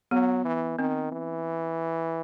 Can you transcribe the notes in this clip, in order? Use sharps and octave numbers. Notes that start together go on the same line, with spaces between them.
F#3 B3
E3
D#3 C4
E3